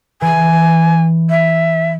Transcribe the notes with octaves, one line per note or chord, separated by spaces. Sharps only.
E3 G#5
E5